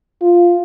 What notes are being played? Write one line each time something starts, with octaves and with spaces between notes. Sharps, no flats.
F4